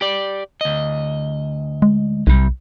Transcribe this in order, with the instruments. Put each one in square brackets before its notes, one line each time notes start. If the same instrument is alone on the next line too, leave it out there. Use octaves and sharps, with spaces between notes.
[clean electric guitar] G4 D5
D2 D#5
[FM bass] G#3
[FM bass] B1 [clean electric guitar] C3 G3